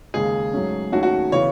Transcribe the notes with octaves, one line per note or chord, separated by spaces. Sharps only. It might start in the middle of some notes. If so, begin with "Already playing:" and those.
D#2 C#3 G#3 G#4
G#2 F#3 A3 C#4
D#2 D#3 A3 C#4 F#4
F#4
C#3 E3 B3 C#5